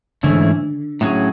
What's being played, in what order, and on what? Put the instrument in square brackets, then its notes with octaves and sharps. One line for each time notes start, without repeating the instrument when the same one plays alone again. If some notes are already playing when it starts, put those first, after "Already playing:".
[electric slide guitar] G#2 E3 A3 C#4 E4 [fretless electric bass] D3
[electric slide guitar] A2 F#3 C#4 G#4